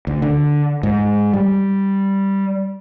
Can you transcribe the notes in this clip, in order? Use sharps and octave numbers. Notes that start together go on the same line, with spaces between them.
D2
D3
G#2
G3